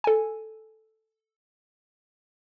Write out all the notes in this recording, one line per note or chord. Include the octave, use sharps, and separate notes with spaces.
A4 G#5